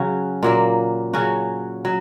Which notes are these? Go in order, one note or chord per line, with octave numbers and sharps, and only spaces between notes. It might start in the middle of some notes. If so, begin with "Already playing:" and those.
Already playing: C#3 F#3 C#4 F#4
A#2 F#3 A#3
C#3 F#3 C#4 F#4
F#3